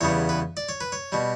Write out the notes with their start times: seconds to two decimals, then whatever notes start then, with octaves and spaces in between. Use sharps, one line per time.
0.01 E2 C#3 G3 B3 C#5
0.29 B4
0.57 D5
0.69 C#5
0.81 B4
0.92 C#5
1.12 B2 G3